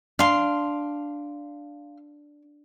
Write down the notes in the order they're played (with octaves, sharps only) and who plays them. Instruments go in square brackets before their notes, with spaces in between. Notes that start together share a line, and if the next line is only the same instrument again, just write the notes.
[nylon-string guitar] D4 [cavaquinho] F5 C6